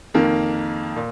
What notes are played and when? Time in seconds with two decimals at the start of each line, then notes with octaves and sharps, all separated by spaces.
0.14 F2 D#3 A#3
0.96 A#2